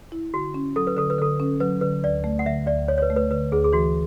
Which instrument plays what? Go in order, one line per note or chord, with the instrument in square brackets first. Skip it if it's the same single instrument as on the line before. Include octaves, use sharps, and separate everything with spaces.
[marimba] E4
[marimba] D3 [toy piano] F#4
[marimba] C#4
[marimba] F#3 [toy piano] A4
[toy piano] B4
[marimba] D3 [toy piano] A4
[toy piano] B4
[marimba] D3 [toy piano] A4
[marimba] C#4
[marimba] F#3 [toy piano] B4
[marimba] D3 [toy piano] B4
[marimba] D2 [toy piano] D5
[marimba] A3
[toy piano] F#5
[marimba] D3 [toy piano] E5
[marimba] D2 [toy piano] D5
[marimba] D2 [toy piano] C#5
[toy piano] C#5
B4
[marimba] A3
[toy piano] B4
[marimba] D3 [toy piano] B4
[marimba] D2 [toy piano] G#4
[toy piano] G#4
[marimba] E3 [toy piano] F#4